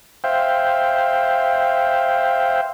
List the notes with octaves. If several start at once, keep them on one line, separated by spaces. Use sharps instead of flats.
C5 E5 F5 G5